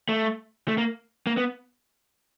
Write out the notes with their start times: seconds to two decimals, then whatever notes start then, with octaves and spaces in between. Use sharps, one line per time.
0.09 A3
0.68 A3
0.78 A#3
1.27 A#3
1.37 B3